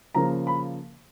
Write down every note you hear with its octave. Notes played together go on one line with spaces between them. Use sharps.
C#3 F3 A#3 A#5
B5